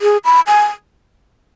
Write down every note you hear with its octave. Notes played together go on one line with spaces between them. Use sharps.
G#4
B5
G#5